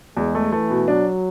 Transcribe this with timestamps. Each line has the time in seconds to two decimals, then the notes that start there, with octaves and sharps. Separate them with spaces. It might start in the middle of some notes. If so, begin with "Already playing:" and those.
0.17 E2 G#3
0.35 A3
0.52 E3 A3
0.70 B2
0.88 F#3 D4